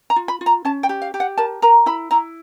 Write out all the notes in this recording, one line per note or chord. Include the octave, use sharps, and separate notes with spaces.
A#5
F4
B5
F4
A#5
C#4 A5
G5
G4
F5
G4
F#5
A#4 A5
A#4 A#5
E4 B5
E4 A#5